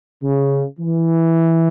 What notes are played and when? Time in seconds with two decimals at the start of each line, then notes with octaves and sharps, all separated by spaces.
0.23 C#3
0.80 E3